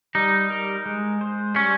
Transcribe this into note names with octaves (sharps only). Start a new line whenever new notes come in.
G3 D#4
A#4
G#3
C5
G3 C#4